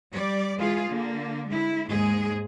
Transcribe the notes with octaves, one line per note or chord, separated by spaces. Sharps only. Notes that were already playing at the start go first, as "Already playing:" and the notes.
G3 D5
E3 G#3 F4 G#4
D3 A#3
G#3 E4
D#2 G#2 G#3 G#4